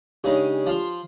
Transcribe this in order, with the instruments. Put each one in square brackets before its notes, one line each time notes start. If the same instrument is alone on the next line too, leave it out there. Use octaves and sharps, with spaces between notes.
[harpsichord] C#3 G#3 D#4 [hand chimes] D4 G4
[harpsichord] F3 F4 C6